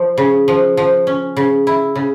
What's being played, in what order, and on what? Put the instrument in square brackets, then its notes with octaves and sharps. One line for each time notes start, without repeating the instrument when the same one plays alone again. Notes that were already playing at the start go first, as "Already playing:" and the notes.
Already playing: [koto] F3
C#3
F3
F3
C#4
C#3
E4
C#3